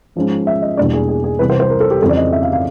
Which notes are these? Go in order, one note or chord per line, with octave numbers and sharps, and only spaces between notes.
G#2 F3 G#3 C#4
E5
D#5
E2 B2 G3 A#3 D4 D5
G#4
G#4
G#4
C2 C3 E3 B4
C5
C5
A#4
A4
G4
F2 C#3 E3 G3 C4 A4
D5
D#5
E5
F5
F5